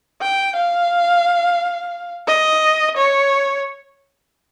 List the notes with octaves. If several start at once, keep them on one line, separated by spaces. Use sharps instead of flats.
G5
F5
D#5
C#5